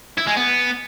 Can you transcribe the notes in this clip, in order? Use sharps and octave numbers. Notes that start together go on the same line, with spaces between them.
E4
G#3
B3